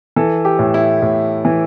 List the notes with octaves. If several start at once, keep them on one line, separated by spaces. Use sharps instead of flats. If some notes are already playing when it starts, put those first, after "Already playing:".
E3 A4
G4
A2
E4
A2
E3